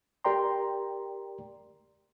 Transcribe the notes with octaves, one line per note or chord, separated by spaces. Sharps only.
G4 A#4 D5 G5 A#5 C6